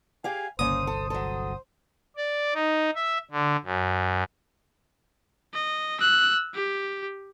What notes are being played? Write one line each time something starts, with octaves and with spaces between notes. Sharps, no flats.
G4 G#4 F5 G#5
G1 C2 C#3 A#3 C5 D#6
A4
F#3 A4 C5
D5
D#4
E5
D3
F#2
D#5
E6 F#6
G4